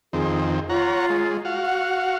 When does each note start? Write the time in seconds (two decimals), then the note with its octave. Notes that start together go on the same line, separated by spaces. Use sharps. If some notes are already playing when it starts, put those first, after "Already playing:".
0.13 F2 D#3 C4 G#4
0.69 F4 C#5 F#5 A#5
1.10 G#3
1.45 F#4 F5
1.65 F#5